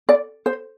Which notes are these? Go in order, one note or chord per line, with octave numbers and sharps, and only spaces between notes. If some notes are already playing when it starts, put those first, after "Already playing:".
D5
C5